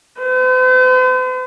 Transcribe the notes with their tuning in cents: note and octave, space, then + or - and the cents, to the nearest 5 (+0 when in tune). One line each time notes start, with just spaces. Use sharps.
C5 -45